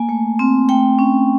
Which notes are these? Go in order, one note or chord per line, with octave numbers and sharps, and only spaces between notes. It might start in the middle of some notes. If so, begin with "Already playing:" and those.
Already playing: A#3 G#5
A3
C4
A3 G5
C#4